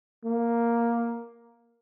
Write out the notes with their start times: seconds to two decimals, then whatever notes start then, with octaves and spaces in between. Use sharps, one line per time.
0.25 A#3